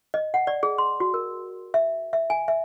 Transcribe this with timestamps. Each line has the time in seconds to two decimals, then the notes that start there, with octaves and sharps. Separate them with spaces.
0.14 D#5
0.34 F#5
0.47 D5
0.63 G#4
0.78 C6
1.00 F#4
1.14 A#4
1.74 E5
2.13 E5
2.30 G#5
2.48 E5